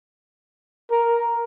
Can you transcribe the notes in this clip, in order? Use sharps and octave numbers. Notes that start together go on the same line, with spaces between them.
A#4